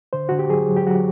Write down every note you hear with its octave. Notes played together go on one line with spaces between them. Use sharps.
D3 C5
D3 F#4
G4
F#3 G#4
F#3
G4
F#3 F#4